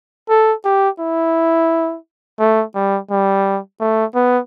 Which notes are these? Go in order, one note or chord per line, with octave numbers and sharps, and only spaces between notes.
A4
G4
E4
A3
G3
G3
A3
B3